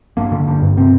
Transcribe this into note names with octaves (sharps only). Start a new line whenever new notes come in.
G2 A#3
D3
G2
G2
C3 C4